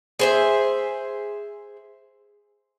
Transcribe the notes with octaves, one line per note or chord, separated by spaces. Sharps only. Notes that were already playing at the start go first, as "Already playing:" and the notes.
G#4 C5 E5